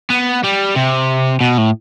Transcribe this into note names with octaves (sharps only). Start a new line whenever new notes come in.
B3
G3
C3
B2
A2